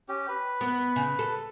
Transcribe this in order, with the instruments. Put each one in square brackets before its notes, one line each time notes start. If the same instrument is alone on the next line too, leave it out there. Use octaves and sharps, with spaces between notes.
[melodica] C#4 G4
B4
[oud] B3
C#3
A4